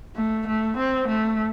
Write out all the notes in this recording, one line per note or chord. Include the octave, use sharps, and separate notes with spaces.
A3
A3
C4
A3